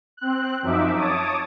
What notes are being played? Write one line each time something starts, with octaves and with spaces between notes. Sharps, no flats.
C4 F#6
F#2 F3 D#4 E5 D6
C#5 A5 D6 D#6